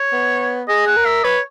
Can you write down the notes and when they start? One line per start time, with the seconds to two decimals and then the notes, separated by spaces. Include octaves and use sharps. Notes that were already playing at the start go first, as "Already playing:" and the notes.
Already playing: C#5
0.12 B3
0.68 G#4 D#5
0.87 F#5
0.96 A#4
1.05 E5
1.24 B4 C#5